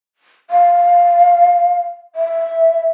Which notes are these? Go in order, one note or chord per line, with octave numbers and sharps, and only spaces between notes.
F5
E5